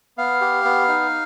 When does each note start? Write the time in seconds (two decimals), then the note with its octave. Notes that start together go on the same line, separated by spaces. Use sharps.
0.18 B3 F5
0.41 G4
0.64 B3
0.88 D#4